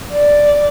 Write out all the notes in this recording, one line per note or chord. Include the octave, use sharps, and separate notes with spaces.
D5